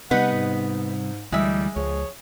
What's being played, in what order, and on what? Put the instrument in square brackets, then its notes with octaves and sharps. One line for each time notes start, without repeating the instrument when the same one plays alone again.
[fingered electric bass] C3 G3 [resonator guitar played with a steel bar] B3 D#4 B4 [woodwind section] F#5
[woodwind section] G#2
[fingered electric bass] D2 E3 [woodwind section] G3 [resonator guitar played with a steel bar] G#3 E5
[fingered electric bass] C#2 [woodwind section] F3 G#4 C#5